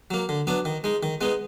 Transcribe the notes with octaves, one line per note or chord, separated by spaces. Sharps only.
F#3 A#3
D3
F#3 B3 D4
D#3
G#3 D#4
D#3
G#3 B3 D#4